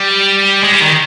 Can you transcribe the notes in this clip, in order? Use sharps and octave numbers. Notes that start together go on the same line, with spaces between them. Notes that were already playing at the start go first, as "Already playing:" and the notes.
Already playing: G3
G#3
G3
D#3